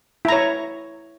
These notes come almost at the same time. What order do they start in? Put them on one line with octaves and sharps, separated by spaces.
E4 A#5 C#5